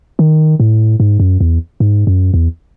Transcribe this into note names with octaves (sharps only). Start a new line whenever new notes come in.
D#3
A2
G#2
F#2
E2
G#2
F#2
E2